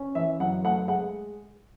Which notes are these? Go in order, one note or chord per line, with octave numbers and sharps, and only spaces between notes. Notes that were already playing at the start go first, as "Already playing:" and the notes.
Already playing: C#4
E3 E5
F#2 F#5
A3 F#5
G#3 F#5